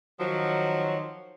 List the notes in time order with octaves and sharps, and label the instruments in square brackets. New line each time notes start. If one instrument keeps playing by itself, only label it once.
[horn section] D#3 F3 F#3